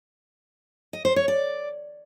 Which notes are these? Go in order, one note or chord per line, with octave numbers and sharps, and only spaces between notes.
D#5
C5
C#5
D5